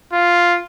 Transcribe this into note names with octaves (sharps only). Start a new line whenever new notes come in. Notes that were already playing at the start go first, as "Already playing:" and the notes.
F4